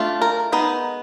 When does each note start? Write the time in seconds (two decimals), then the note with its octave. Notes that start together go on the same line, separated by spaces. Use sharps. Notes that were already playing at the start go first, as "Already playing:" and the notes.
Already playing: A3 D4 F4
0.22 A#4
0.52 G#3 B3 D#4